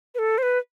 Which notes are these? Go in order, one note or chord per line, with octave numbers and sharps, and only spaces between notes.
B4
A4
C5
B4